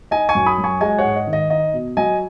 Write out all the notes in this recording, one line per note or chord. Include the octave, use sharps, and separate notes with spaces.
D#4 D#5 G#5
G#5 C#6
F#2
B5 D#6
F#3
G#5 C#6
G#3 D#5 G#5
C#5 F#5
G#2
D#5
D#3
D#5
D#4 D#5
B2
F#3 D#5 G#5